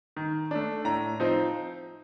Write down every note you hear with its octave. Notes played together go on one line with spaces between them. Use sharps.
D#3
A3 D4
A2 A#5
F3 C4 D#4